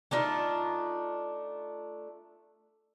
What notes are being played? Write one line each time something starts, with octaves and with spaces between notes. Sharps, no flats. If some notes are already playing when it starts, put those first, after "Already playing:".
A3 D4 D#4 F4